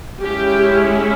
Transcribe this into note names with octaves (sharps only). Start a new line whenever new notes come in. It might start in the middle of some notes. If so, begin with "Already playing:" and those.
G#3 C#4 E4 G4